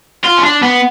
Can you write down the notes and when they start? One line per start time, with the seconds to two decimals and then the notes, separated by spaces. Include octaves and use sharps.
0.24 F4
0.38 C#4
0.43 D4
0.62 B3